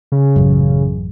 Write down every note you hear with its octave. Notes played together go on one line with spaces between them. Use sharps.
C#3
A1 F#2